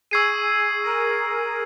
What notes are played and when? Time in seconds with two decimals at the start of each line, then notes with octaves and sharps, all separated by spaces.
0.11 G#4 C#6 E6 G#6 C7 D#7
0.83 A#4